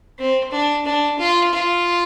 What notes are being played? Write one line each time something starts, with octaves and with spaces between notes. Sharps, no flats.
C4
D4
D4
F4
F4